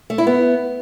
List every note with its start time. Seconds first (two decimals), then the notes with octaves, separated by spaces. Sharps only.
0.10 A3
0.18 E4
0.27 B3